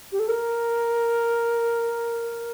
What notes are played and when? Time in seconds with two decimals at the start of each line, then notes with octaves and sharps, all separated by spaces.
0.12 G4
0.19 A4
0.28 A#4